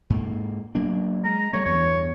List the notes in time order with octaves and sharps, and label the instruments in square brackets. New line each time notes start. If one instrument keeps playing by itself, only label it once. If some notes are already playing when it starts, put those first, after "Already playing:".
[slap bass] G#2 A#3
F#3 A#3 D4
[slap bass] G#3 [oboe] A#5
[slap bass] F#3 G3 A3 [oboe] C#5
[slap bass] E2 G2 E3 [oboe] C#5